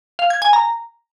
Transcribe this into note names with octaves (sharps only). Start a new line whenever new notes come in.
F5
G#6
G#5
A#5